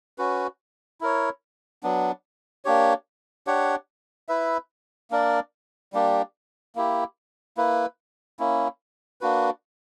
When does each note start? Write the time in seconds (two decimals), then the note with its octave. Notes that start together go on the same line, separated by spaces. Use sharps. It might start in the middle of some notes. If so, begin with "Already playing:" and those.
0.18 C#4 F#4 B4
1.01 E4 A#4 C#5
1.83 F#3 B3 D4
2.65 A#3 D4 G4 C#5
3.47 D4 G4 C#5 F#5
4.29 E4 B4 E5
5.11 A#3 D4 A#4 D5
5.93 G3 A#3 D4 G4
6.75 A#3 E4 G4
7.57 A#3 E4 B4
8.39 A#3 C#4 E4
9.21 A#3 D4 F#4 B4